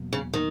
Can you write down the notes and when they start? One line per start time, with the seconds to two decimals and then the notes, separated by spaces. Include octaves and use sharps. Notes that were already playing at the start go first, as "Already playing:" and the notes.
Already playing: E2 B2 F#3 A#3
0.13 C#3
0.33 D#3